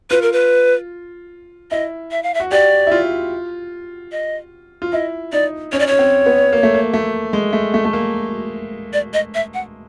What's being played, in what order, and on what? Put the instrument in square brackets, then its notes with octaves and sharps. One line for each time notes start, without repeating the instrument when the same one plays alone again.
[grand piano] F4 [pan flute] B4
[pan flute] A#4
B4
[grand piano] E4 [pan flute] D#5
[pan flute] E5
F5
E5
[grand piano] F#4
[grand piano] G4 [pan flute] D5
[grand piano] E4
F4
[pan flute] D#5
[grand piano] F4
[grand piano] E4 [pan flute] D#5
[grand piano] D#4 [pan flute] D5
[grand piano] C#4 [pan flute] C#5
[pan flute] D5
[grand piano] C#4 [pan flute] C#5
[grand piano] C4
B3
A#3
A3
A#3
A3
G#3
A3
A3
A3
A#3
[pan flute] D5
D#5
E5
F#5